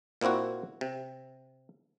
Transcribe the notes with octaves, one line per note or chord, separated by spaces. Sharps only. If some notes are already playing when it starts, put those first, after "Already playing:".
A#2 A#3 C4 E4 F#4
C3